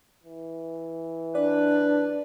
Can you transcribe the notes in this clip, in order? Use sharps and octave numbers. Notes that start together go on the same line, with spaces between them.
E3
D4 B4 D5